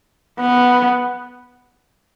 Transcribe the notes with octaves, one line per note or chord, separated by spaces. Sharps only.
B3